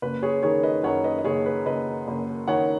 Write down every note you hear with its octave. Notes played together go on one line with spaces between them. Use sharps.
F#1 B4
G#4 C#5
D#3 G#4 C#5
B4 D#5
F#2 C#5 F#5
B4 D#5
D#5
F#1 G#4 C#5
B4
F#1 B4 D#5
F#1
D#3 C#5 F#5